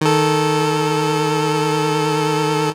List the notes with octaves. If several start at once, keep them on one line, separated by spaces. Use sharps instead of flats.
D#3 A4